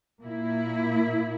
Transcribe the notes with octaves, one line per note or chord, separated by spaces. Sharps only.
A#2 A#3 E4